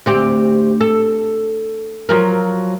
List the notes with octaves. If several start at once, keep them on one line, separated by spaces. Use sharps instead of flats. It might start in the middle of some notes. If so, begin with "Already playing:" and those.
D2 C4 G4
A4
F3 F#3 A#4